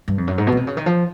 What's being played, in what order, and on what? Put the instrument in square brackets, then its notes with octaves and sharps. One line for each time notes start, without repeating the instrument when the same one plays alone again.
[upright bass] G2
F2
F#2
G#2
B2
C#3
C3
C#3
D#3
F3